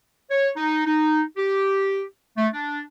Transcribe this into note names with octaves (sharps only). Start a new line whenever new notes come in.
C#5
D#4
D#4
G4
A3
D4